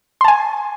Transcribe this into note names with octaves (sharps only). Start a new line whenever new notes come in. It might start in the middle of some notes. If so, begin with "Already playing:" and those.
G#5 A5 C6